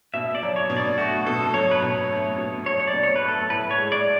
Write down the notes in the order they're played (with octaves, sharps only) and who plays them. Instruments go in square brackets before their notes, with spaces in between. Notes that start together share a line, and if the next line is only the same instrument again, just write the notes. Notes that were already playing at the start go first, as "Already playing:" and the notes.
[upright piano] B2 [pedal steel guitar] E5
[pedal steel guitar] D5
[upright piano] F#3
[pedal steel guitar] C#5
[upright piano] B2
[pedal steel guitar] D5
[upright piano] A3 [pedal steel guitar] F#4
[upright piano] B2 [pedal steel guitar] A4
[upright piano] F#3 [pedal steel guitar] C#5
[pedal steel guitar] B4
[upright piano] B2 [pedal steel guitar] C#5
[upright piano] A3
B2
[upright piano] F#3 [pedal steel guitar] C#5
[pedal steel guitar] C#5
D5
[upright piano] B2
[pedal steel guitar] C#5
B4
[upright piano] A3
[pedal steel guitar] A4
[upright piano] A2 [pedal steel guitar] B4
[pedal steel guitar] C#5
[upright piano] G#3
[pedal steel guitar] D5